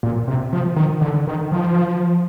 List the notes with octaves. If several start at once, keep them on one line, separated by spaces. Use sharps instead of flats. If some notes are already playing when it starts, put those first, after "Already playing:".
A#2
C3
F3
D#3
D3
D#3
F3